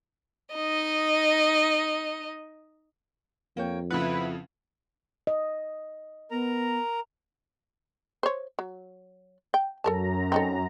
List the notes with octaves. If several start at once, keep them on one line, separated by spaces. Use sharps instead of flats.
D#4 D#5
F2 A#3 C#5 G5
C#3 F3 E4 F4 A4 B4 F#5
D#5
B3 A#4 A#5
C5 C#5
F#3
G5
F#2 A4 A#4 A5 A#5
C4 D#4 A4